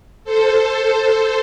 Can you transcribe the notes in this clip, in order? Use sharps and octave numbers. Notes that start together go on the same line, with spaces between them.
A4 C5